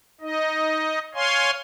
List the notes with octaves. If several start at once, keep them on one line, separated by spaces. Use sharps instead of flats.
D#4 D#5
C#5 F5 G#5 C6